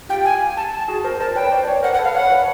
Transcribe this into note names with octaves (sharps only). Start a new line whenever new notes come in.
F4 G4 G5
G#5
A5
A5
F#4 G#4
A#4 C5
A#4 C5 A5
B4 C#5 G5
C5 D5
B4 C#5
A#4 C5 F#5
F#5
A4 B4
F5
B4 C#5 F#5
B4 C#5